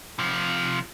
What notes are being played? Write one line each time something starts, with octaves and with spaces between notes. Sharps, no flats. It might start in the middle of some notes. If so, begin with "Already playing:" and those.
C3 F3